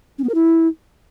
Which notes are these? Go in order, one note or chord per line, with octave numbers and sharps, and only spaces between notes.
C#4
B3
A#4
E4